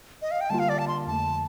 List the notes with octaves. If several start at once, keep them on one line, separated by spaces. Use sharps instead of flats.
D#5
F5
G5
D3 G3 A#3 F4 A5
F5
D5
A5
C6
F2 D3 A3 A5